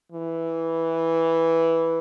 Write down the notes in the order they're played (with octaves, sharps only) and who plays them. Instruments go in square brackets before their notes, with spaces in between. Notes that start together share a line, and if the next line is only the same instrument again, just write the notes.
[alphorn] E3